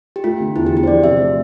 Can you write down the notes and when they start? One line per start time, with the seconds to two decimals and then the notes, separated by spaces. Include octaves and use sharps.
0.16 G4
0.24 A3 F4
0.40 D3
0.56 E2 E4
0.66 G4
0.71 E2
0.77 G4
0.83 C5
0.87 F3 D5
1.03 C3 E5
1.20 A3